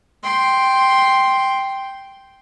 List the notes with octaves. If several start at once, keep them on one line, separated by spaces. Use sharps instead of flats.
G5 C6